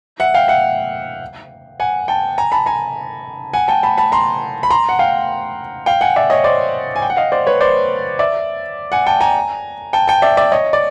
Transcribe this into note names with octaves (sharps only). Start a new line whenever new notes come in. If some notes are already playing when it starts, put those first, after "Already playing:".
E5 F#5
F5 G5
E5 F#5
F#5 G#5
G5 A5
G#5 A#5
A5 B5
G#5 A#5
F#5 G#5
G5 A5
A5 B5
A5 B5
A#5 C6
B5
A#5 C6
F#5
F5 G5
F5 G5
F#5 G#5
D5 E5
C#5 D#5
C5 D5
G#5
G5
F#5
D#5 F5
C5 D5
B4 C#5
C5 D5
D5 E5
F#5 G#5
G5 A5
G#5 A#5
G5 A5
G5 A5
D5 E5
D5 E5
C#5 D#5
D5